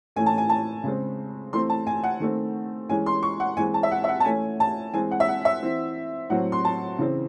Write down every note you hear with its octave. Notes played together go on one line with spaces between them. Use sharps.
A2 E3 A3 C#4 G#5
A5
G#5
A5
C#3 G#3 C4
E3 A3 C4 C6
A5
G#5
F#5
D#3 A3 C4
E3 G#3 C#4 G#5
C6
C#6
F#5
E3 G#3 C4 G#5
A5
E5
F#5
E5
F#5
A5
E3 A3 C#4 G#5
A5
E3 G#3 C4 G#5
F#5
E5
F#5
E5
E3 C4
A2 F#3 C4 F#5
C6
A5
C#3 E3 C4